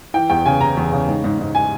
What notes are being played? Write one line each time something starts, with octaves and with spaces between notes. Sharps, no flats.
E3 G5
E2 G5
C#3 G#5
C#3 A#5
E2
C#3
G#2
G#2
G#2
G#5